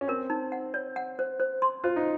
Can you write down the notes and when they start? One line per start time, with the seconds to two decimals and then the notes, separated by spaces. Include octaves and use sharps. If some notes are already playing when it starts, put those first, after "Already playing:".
0.01 C#4
0.08 C4 A#4
0.30 D#4
0.52 F#5
0.74 C#5
0.96 F#5
1.19 C5
1.40 C5
1.62 C6
1.84 F4 C5
1.96 D#4